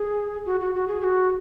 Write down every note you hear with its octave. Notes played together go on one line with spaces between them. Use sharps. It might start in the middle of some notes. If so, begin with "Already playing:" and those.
Already playing: G#4
F#4
F#4
F#4
G#4
G#4
F#4